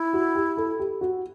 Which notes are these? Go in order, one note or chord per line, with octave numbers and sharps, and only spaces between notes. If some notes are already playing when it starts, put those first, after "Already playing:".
Already playing: E4
F#4
G4
A4
G4
F#4